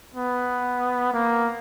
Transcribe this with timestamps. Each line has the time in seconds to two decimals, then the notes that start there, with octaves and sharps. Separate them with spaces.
0.15 B3
1.14 A#3